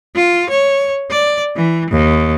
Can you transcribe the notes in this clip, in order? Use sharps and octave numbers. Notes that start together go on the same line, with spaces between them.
F4
C#5
D5
E3
D#2